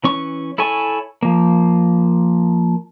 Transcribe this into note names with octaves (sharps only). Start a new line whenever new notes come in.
E3 C#4 C#6
E4 A4 C#5 G#5 C#6
F3 A#3